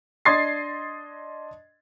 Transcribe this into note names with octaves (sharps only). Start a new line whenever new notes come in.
D4 D#5 C6 G#6 A6 C7